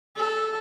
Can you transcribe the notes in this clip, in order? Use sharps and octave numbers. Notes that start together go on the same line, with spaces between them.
A4